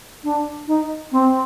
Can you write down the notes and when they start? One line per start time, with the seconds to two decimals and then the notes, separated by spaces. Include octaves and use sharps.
0.24 D4
0.67 D#4
1.12 C4